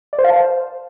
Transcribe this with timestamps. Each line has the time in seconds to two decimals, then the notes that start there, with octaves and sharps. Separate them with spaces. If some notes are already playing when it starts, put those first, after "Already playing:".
0.13 D5
0.19 C5
0.24 F5
0.30 A5
0.36 C5